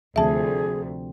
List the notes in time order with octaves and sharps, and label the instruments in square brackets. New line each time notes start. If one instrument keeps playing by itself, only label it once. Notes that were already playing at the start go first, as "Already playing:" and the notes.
[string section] D2 [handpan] C3 F3 C4 [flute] G#4 [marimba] E5 A5